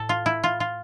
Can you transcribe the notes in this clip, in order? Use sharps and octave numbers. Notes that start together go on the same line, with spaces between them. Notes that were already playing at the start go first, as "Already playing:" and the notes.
Already playing: A2 A4
F4
E4
F4
F4